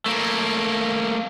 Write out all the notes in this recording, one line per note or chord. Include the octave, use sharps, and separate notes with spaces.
A3 A#3